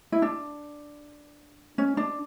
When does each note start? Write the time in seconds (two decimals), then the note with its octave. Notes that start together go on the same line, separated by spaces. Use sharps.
0.12 E4
0.22 D4
1.78 C#4
1.97 D4